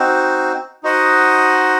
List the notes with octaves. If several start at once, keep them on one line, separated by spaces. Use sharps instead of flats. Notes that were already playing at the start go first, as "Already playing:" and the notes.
Already playing: C4 D#4 F#4 C5
D#4 F#4 C5 D#5 F#5